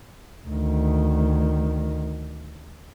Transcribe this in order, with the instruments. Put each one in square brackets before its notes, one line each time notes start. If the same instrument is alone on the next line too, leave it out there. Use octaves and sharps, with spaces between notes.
[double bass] D2 D#3